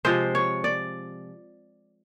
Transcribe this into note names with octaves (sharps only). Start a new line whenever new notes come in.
C3 F3 G#3 C5
C#5
D5